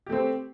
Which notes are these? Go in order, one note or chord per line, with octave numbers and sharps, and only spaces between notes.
A3 C4 G4